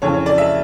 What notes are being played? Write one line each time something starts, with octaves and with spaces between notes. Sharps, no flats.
F2 C#3 E3 C#5
C#5
D5
E5